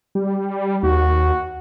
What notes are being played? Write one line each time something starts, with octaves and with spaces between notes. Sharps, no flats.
G3
D#2 F#4